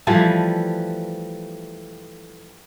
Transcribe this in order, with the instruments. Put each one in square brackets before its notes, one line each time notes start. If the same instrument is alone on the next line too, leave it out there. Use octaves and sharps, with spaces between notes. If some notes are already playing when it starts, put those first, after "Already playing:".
[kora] E3 F3 G3 A3